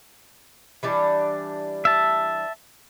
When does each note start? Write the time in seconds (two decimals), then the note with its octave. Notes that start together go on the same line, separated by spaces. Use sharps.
0.83 E3 G3 D4
1.85 E5 A5